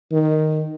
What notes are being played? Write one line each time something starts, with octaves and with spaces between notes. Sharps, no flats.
D#3